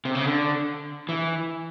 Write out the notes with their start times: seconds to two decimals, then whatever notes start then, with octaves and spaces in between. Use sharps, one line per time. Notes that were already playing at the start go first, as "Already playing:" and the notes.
0.05 C3
0.15 C#3
0.26 D3
1.09 E3